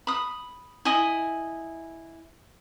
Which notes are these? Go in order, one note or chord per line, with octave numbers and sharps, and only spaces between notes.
B5 D#6
E4 D#5 G#5 D#6